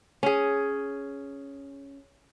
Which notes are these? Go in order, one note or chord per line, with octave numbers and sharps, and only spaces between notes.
C#4 G#4